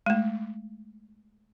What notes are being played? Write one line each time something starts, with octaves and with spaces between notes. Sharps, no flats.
G#3 A3